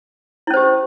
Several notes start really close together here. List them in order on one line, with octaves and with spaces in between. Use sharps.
E4 C#4 C5 G4